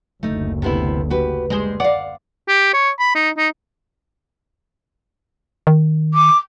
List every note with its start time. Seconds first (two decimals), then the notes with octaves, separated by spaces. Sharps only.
0.23 F#1 D2 A3 D#4
0.62 C3 B3 E4
1.10 F#4 G4 B4
1.50 G3 G#3 G#4 C5
1.80 D5 F5 F#5
2.48 G4
2.73 C#5
2.99 B5
3.15 D#4
3.38 D#4
5.67 D#3
6.14 D6